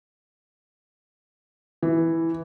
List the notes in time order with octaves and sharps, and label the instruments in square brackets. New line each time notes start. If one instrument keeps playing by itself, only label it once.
[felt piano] E3